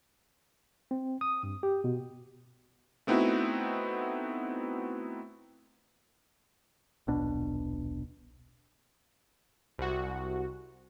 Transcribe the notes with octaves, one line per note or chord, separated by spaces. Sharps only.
C4
D#6
G2
G4
B2
A3 B3 C4 D#4 E4 F#4
D#1 B1 B2 D4
C2 F#4